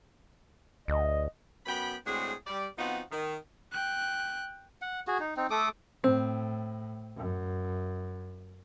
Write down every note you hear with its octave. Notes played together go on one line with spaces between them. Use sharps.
D2 D#5
F#2 B3 F#4 G5 B5
A2 G#3 C4 D4 F#4 G#4
G3 D5
F3 B3 C4 D#4 F4 F#4
D#3
G5 F#6
F#5
F#4 G#4
D#4
C4 D#4
A3 A4 D6 D#6
A2 C4
F#2